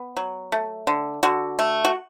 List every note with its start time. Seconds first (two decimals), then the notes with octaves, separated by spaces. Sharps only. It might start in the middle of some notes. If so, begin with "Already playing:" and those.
Already playing: B3
0.17 F#3
0.52 A3
0.87 D3
1.23 D3 F#4
1.59 A3
1.85 F#4